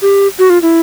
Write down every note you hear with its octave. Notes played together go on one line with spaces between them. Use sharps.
G4
F#4
F4
E4